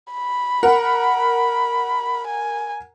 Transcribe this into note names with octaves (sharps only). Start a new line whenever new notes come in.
B5
A#4 F#5
G#5